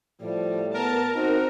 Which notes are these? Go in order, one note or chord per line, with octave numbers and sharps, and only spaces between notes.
A2 F3 G3
B3 A#4 A5
C4 D#4 F#4